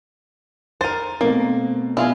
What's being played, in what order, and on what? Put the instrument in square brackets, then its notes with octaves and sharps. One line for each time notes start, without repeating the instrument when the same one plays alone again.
[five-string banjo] A#4 C5 [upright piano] A6 D#7
[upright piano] B2 A3 C4 [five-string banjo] A#3
[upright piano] B2 [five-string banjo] E4 F4 G#4